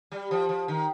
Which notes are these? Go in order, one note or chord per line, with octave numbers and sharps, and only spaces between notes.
G3
F3
F3
D#3